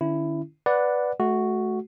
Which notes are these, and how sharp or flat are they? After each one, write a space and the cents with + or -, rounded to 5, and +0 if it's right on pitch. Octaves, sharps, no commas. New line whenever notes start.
D3 +40 C#4 +15 E4 +10
B4 +0 D5 +0 F#5 -10
A3 -30 F#4 +0